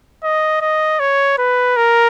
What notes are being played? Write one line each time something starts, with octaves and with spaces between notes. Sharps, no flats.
D#5
D#5
C#5
B4
A#4